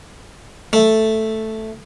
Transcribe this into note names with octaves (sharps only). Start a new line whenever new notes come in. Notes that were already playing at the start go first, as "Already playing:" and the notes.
A3